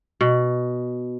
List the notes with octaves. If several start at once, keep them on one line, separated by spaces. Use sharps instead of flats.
B2